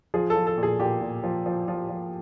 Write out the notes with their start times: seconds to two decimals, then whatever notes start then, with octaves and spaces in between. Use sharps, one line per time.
0.14 F3 G#4
0.30 A4
0.36 F3
0.47 A4
0.58 A#2
0.63 G#4
0.79 A#2 G4
1.01 A#2
1.24 F3
1.46 F3
1.68 F3
1.89 F3